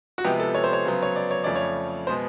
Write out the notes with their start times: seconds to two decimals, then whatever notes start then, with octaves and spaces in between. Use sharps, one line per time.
0.18 F#4
0.24 C3 F3 G#3 B3 G4
0.40 A4
0.55 C#5
0.64 C5
0.73 C#5
0.85 C#3 F#3 B3 C5
1.03 C#5
1.16 D5
1.31 C#5
1.44 F2 C#3 F3 A3 D5
1.56 C#5
2.07 B2 G#3 B3 C5